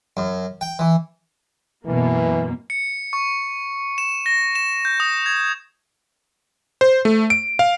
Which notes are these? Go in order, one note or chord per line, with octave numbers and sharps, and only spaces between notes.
F#2
G5
E3
F#2 B2 E3 A#3
C#7
C#6
E7
A#6
E7
G6
D#6
G#6
C5
A3
D7
F5